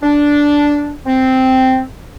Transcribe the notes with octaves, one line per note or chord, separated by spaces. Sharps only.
D4
C4